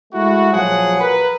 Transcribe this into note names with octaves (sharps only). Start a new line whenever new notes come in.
G#3 A3 E4 F#4
A#1 F3 F#3 G#4 F#5
A#4 B4